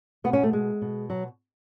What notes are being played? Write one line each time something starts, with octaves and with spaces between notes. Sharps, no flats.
B2 B3
C#4
A3
G#3
B2
F#3